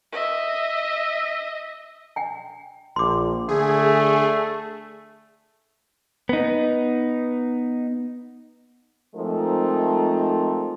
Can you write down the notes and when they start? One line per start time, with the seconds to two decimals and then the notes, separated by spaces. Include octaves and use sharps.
0.12 D#5 E5
2.16 G5 G#5
2.96 A#1 C6 D6
3.49 D3 A3 G#4
6.29 B3 D#4
9.15 F3 G#3 A3 C4 D#4 A#4